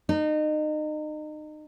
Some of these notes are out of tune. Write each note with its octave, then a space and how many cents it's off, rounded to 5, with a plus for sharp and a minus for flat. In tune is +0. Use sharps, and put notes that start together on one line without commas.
D#4 -30